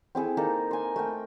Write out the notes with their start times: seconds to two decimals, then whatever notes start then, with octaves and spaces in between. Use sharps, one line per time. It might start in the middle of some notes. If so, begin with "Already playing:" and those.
0.15 C4 E4 G#4 A4
0.37 A#3 D#4 A4 A#5
0.71 G#5 C6
0.96 A3 A#4 G5